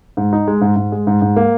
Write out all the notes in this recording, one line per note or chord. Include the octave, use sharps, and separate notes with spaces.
G#2
D#4
G#3
G#2
G#2
G#3
G#2
G#2
A#3